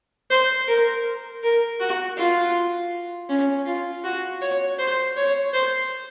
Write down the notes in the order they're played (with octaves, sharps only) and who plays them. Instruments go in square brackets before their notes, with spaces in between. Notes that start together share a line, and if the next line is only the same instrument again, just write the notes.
[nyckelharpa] C5
A#4
A#4
F#4
F4
C#4
F4
F#4
C#5
C5
C#5
C5